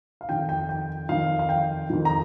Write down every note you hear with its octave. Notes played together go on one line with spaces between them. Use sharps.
F5
F2 D#3 G5
G5
G5
F2 D#3 F5
F5
G5
F2 D#3
A#5